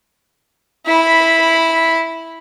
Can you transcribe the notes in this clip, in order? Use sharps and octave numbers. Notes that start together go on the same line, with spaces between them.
E4 B5